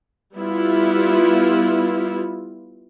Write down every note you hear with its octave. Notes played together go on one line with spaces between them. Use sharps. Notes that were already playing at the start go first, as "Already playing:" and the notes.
G3 B3 E4 F4